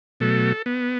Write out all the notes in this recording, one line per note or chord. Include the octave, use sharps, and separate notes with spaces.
B2 F#3 A3 A4
B3